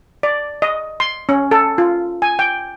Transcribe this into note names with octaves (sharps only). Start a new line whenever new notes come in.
D5
D#5
C6
C#4
A4
F4
G#5
G5